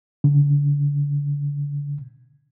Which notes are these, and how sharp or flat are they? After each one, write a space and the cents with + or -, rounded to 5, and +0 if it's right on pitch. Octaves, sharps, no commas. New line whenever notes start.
D3 -35